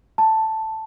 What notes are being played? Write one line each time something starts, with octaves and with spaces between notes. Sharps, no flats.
A5